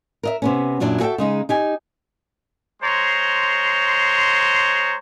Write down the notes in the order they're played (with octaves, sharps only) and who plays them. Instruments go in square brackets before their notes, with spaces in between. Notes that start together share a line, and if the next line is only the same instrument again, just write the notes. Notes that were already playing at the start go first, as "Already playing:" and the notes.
[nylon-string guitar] A#4 D#5 E5
C3 B3 C#4
F#2 A#2 F#3 D4 E4
F#4 G#4 A4 D#5 E5 G5
C#3 G#3 D#4
D#4 G4 G#5
[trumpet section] G#3 C5 C#5 A#5 C6